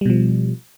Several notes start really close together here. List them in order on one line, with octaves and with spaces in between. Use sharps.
G3 B2 F3